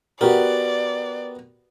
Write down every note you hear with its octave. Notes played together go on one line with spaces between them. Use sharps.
B3 F#4 G4 A#4 D5